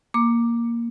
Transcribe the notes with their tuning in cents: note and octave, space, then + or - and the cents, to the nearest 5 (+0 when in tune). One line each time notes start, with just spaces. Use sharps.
A#3 +0 D6 +5